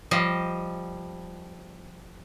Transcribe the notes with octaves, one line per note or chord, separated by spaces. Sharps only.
F3 G3 D#5